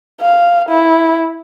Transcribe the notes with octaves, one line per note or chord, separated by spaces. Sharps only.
F5
E4